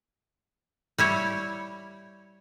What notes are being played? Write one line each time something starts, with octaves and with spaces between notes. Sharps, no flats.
G3 E4 C#5